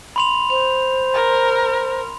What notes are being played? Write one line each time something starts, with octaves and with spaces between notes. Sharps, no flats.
B5 C6 F7
C5 F7
A#4